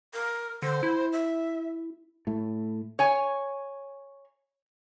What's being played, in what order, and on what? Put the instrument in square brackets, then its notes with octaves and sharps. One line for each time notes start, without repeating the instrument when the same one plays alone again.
[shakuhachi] A#4
[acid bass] D3 [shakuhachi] C5
[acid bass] E4
[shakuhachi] E5
[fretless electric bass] A2 A3
[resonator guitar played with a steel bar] C#5 G#5